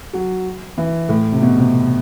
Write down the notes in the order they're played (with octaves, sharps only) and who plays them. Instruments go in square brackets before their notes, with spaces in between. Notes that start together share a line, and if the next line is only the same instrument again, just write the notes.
[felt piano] F#3
E3
A2
C3
B2
C3